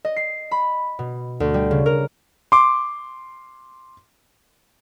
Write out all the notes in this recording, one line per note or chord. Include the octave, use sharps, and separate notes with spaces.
D#5
C7
B5
B2
D2
G3
C#3
A#4
C6 D6